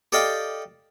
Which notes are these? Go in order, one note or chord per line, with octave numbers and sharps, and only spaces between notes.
G4 A4 D5 D#5 F5 G5